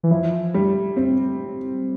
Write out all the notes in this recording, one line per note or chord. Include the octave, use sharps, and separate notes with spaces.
E3
F3 E4
G3
C4